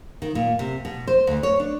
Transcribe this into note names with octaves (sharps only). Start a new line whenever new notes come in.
D#3
A#2
C3
B2
C5
D2
C#5
D4